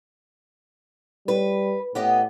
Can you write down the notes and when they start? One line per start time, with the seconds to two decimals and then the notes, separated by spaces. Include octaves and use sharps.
1.28 G3 B4
1.95 A2 B3 G4 D#5